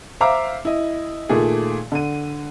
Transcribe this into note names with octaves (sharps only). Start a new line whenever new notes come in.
C5 E5 F5 A#5 D6
E4 D#5
A#2 D#3 A3 G#4
D3 D#7